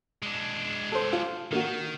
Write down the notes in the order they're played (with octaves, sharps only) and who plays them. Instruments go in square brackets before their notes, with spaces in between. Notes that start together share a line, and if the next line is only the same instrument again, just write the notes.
[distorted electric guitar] G#3 D4
[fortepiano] A4 C5
F4
[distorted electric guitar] D#3 [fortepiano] A#3 F#4